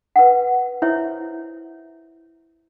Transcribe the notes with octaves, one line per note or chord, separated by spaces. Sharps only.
B4 F#5
E4 C5 C#5 E5